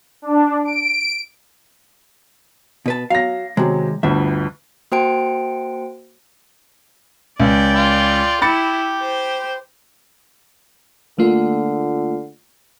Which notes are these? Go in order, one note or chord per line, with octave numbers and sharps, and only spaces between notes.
D4
D7
B2 B4 A5
F#3 F5 A#6
C3 D#3 F#3 G#3
G1 D2 E5
A#3 F#4 C5 G5 A5 D7
C#2 D5 G5
F4
E4 G4 B5 A6 C#7
C5
D3 A3 A#3 F4